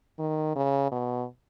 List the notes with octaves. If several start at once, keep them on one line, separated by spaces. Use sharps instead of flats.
D#3
C#3
B2